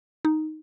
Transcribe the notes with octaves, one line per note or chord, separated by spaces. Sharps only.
D#4